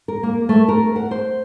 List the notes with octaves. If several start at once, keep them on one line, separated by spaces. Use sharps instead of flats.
A#4
A#3
A3
A#4
F#5
C5